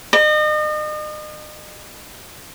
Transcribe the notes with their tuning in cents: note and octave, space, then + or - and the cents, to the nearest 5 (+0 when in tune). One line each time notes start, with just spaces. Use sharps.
D#5 -35